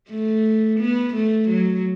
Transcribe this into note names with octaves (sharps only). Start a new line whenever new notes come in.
A3
B3
A3
F#3